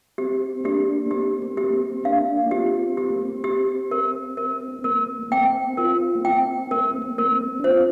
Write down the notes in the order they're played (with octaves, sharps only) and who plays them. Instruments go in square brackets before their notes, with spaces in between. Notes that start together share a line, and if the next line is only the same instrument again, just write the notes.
[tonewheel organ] C4 [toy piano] G4
[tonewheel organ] A#3 D4 [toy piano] G4
[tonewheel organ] C4 [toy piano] G4
[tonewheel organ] A#3
[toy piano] G4
[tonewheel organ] C4
[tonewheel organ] A#3 D4 [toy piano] F5
[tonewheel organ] C4 F4 [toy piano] G4
[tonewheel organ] C4 [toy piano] G4
[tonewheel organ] A#3
C4
[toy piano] G4
A#4
A#4
[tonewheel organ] C4
[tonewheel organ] A#3 [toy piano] A#4
[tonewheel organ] A#3
[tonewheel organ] C4 [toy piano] G5
[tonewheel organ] C4 F4 [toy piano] A#4
[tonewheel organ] A#3
[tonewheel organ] C4 [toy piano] G5
[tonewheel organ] A#3 [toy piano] A#4
[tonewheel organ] C4
A#3
[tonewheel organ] A#3 [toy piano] A#4
[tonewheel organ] C4
D4
[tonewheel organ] C4 F4 [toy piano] C5